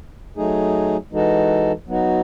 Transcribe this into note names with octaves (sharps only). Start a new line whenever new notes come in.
F#3 A3 D#4 G#4
E3 G#3 D#4 F#4 A4
F#3 B3 D#4 F#4